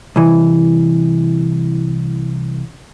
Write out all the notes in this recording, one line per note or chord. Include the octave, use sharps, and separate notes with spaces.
C2 E3